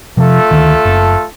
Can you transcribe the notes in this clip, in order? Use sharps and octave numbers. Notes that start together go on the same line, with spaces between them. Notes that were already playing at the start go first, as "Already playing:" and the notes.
C3 F3 A3 F4 A4
D2 D#3
F#1